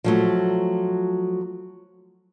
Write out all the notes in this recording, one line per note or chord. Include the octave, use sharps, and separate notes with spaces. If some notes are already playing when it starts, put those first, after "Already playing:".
F3 F#3 A3